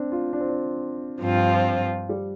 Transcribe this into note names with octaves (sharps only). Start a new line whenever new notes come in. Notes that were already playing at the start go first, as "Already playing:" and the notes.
Already playing: C4 D4
F4
D4
C4
D4
G2 F3 C4 F4
G3